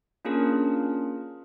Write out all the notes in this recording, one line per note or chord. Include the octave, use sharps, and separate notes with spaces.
A#3 C#4 D4 F4 G#4 A#4